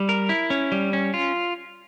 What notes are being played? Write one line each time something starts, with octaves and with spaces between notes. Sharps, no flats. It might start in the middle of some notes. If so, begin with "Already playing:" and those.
Already playing: G3
A#4
E4
C#4
G3
C#4
F4